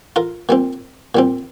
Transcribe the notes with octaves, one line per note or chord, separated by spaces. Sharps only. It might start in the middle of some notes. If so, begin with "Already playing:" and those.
F4 A#4
A#2 G3 C4
A#2 G3 C4